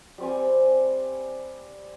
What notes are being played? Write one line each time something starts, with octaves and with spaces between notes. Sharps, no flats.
G3 C4 G#5